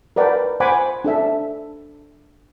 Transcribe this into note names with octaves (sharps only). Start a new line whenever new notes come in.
A#4 B4 D5 F#5 G5 A5
C5 F#5 G#5 B5 D6
D4 A4 E5